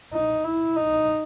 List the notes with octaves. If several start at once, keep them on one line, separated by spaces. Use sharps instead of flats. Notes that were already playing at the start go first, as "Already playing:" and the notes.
D#4
E4
D#4